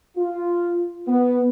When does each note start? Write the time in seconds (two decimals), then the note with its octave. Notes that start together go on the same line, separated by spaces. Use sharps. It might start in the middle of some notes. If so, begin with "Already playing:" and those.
0.17 F4
1.08 B3